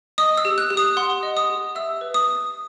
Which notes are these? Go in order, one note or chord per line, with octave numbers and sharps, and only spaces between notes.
D#5 D#6
E6
G4
F#6
G4
D#6
F#5 C6
D#5
D#6
G4
E5 E6
B4
D#6